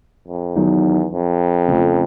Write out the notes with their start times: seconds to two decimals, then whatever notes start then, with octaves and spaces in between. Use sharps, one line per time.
0.28 F2
0.56 E2 D#3 F#3 B3 D#4
1.12 F2
1.68 C#3 F3 A3